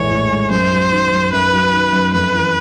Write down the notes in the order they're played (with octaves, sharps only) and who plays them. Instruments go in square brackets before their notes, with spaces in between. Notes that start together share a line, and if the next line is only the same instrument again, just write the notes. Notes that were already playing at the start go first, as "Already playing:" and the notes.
Already playing: [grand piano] A#1 A2 E3 G#3 [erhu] C#5
[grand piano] A2
G#3
[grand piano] F#2 [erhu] C5
[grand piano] F#3
D#3
F#2
[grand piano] F#2 [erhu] B4
[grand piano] F#3
D#3
F#2
[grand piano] F2 [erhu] B4
[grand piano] E3